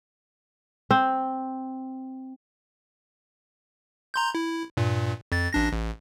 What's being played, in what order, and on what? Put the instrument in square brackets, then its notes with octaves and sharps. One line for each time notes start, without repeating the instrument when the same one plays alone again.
[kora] C4
[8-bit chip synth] A#5 C6 G6
E4
G2 A#2
F2 A6
A1 D4 A#6
A1